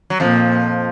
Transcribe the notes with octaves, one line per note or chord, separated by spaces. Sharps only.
F#3
F2 A#2 F3